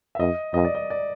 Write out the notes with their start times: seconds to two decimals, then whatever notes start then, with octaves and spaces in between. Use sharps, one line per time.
0.15 E5
0.19 F2 D#5
0.54 F2 D#5
0.65 D5
0.75 D#5
0.90 D5